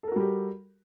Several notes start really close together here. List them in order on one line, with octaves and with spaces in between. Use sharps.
A4 A#4 F#4 G3 G4